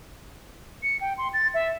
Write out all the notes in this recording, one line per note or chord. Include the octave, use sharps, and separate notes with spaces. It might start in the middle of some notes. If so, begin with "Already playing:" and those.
C#7
G5
C6
A6
E5